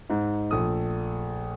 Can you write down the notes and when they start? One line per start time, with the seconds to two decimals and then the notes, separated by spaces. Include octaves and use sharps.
0.09 G#2 D#4
0.51 A#1 A3 D#6